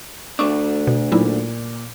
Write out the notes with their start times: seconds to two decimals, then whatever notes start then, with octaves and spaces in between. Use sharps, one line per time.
0.39 D2 A3 D4 C#6 D6
0.87 B2
1.12 A#2 F#3 D#4 E4